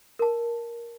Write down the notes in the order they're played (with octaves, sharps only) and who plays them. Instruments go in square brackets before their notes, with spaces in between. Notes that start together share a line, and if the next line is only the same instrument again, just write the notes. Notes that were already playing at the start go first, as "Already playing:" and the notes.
[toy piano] A#4 A5